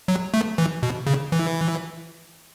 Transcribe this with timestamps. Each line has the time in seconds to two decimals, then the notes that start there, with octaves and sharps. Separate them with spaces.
0.08 F#3
0.34 A3
0.58 E3
0.83 B2
1.07 C#3
1.32 E3